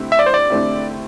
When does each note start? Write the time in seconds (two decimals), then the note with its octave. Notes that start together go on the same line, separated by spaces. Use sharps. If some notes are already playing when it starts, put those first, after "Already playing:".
Already playing: D3 A3 C4 E4 G4
0.12 E5
0.19 D5
0.26 C5
0.34 D5
0.50 D3 A3 C4 E4 G4